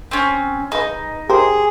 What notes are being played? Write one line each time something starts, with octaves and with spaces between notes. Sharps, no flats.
C4 C#4
D#4 G#4 B4
G4 G#4 A#4 C5